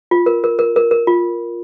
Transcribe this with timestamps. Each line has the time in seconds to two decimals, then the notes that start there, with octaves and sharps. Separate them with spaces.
0.11 F4
0.26 A#4
0.44 A#4
0.59 A#4
0.76 A#4
0.91 A#4
1.07 F4